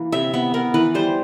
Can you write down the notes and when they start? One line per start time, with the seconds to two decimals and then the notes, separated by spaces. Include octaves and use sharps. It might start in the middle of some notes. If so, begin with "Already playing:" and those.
Already playing: E3 A#3
0.12 C3 E5
0.34 B3 E5
0.54 B3 A#4
0.74 E3 B4
0.94 G3 C5